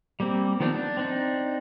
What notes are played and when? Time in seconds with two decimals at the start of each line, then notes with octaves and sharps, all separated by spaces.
0.20 G3 A#3 C4
0.60 D#3 F3 B3 C4 D4
0.73 D4
0.97 C4 D4 D#4